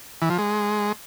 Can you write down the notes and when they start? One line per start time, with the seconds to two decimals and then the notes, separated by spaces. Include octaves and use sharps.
0.22 E3
0.30 F3
0.38 G#3